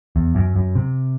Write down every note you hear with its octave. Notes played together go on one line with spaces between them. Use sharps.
E2
F#2
F#2
C3